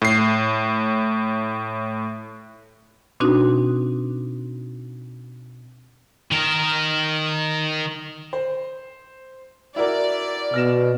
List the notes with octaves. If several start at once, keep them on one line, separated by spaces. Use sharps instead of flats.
A2 C7
B2 C4 D4 D#4 F#4
D#3 A#4
C5
E4 F#4 A#4 D5
B2 F6 A#6 E7